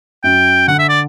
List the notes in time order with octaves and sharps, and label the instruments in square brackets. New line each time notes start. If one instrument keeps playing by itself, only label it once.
[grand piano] F#2 [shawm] G5
[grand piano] D3 [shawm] F#5
[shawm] E5
D5